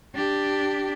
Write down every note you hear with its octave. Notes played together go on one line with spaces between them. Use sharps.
D4 G4